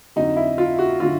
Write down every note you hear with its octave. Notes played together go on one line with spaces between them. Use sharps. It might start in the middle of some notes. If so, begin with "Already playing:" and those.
F2 D3 F#3 D#4
E4
F4
F#4
D3 F#3 F4